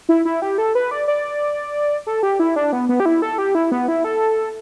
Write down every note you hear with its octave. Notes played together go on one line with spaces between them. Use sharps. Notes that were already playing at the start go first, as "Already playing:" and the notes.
E4
E4
G4
A4
B4
D5
D5
A4
G4
E4
D4
B3
B3
G4
E4
A4
G4
E4
B3
E4
A4